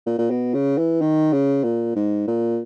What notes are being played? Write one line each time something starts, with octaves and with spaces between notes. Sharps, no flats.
A#2
A#2
B2
C#3
E3
D#3
C#3
A#2
G#2
A#2